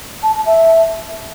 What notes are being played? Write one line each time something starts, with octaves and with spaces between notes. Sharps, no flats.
A5
A5
E5